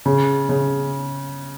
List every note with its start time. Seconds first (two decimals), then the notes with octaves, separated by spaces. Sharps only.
0.06 C#3
0.49 C#3